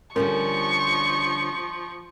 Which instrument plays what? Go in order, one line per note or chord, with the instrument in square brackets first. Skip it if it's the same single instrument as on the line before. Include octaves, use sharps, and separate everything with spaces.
[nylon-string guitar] D3 G3 C#4 [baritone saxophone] F3 [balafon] A#4 [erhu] C#6